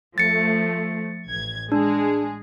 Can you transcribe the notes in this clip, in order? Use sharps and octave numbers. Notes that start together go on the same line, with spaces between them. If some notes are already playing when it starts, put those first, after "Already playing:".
F3 A3 A6 C#7
A1 G#6
G#3 D4 G#4